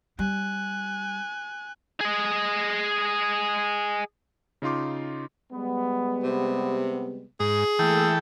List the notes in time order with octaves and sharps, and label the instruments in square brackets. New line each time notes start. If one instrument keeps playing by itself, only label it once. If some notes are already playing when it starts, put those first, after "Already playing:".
[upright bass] G3 [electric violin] G#5 F#6
[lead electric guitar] G#4 D#5
[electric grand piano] C#3 D#4 F4 C6 D6
[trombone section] G3 G#3 B3
[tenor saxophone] C3
[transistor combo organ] G#2 [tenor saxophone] G#4
[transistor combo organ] E3 A4 G5 [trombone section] A3 A#3